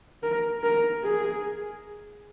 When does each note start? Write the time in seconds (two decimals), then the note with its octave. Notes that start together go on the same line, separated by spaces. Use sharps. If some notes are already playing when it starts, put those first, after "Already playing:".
0.23 A#4
0.63 A#4
1.04 G#4